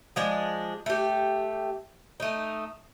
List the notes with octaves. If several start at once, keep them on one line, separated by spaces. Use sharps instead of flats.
F3 G#3 D4
A3 G4
A3 D#4